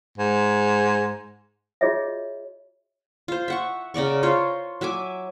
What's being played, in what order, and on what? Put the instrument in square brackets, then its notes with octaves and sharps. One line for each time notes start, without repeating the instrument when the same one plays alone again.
[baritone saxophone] G#2
[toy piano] F4 F#4 G#4 C#5 D#5 E5
[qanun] F4 C5
E5 F#5 C#6
C#3 A#4 D5 C#6
F4 C5 C#5
F#3 E5 G#5 D6